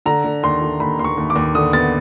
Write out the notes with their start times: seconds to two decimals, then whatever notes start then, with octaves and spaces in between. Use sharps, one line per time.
0.06 D3 A#5
0.24 D3
0.43 D#2 C6
0.62 D3
0.80 D#2 B5
0.99 D#2 C6
1.04 C#6
1.17 D#2
1.30 D6
1.36 D#2
1.55 D3 D#6
1.73 B3 A6